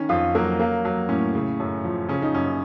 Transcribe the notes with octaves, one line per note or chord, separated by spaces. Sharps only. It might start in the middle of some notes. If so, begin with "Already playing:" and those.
Already playing: D#3 C#4
F2 F4
F#3 A#3
F#3 A#3
F#3
A2 C#4
C#3
F#2
F3
C#3 C#4
D#4
F#2 C#4